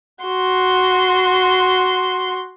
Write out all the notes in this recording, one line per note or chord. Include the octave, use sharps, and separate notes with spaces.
F#4 C6